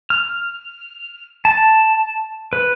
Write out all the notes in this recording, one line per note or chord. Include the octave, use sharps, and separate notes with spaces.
F6
A5
B4